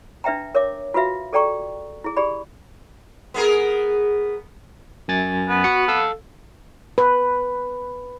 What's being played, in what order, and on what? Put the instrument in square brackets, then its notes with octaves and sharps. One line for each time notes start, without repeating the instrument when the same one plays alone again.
[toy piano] D4 B4 E5 G5 A#5
A#4 C#5 E5 D6
F4 F#4 B4 E5 F5
G#4 A4 D5 G5 A#5 C#6
E4 G#4
G4 G#4 D5 B5
[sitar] B3 G#4 A#4
[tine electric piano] F#2 G#5 A6
[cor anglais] B3
[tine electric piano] F#4 F#6 C#7
A4 F5 E6
[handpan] B4